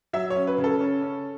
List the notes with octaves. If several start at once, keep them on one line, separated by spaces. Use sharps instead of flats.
F#3 E5
C#5
C#4
B4
C#3
A4
C#4
C#4